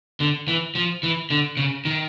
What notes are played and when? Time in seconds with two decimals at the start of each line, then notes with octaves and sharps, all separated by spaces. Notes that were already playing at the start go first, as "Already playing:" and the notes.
0.20 D3
0.48 E3
0.75 F3
1.03 E3
1.30 D3
1.57 C#3
1.85 D#3